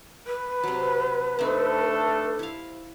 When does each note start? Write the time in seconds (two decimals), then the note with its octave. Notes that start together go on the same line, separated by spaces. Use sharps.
0.26 B4
0.63 C3 F#3
1.39 A3 C4 D4 D#4 A4
2.39 E4 F5